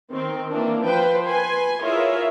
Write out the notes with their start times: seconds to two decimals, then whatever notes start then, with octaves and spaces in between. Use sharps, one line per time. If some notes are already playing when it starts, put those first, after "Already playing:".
0.11 D#3 C4
0.50 E3 A#3 D4
0.83 F3 B4 C5 G5
1.27 B4 G#5 C6
1.82 E4 F4 G#4 A#4 C#5 E5